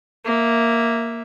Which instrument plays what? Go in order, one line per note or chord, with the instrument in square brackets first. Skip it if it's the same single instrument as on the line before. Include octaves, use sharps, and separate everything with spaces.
[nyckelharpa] A#3 E5